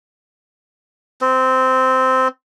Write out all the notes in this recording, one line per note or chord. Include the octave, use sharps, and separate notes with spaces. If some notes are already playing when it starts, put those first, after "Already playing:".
C4